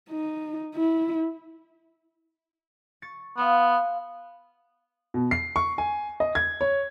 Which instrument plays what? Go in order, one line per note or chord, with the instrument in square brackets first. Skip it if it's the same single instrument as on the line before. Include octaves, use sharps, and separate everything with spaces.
[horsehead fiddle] D#4
E4
[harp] C#6 A6 C#7
[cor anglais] B3 [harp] F5 C6 D#6
[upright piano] B2
C7
C#6
G#5
D#5
G#6
C#5